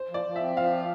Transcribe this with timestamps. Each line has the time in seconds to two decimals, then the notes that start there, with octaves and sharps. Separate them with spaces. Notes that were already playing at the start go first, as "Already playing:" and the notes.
Already playing: C5
0.09 F3
0.14 D5
0.25 F3
0.36 E5
0.41 C4
0.56 F3 F5
0.72 F4